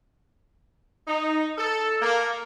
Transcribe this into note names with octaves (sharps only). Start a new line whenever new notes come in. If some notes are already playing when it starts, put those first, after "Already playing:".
D#4
A4
A#3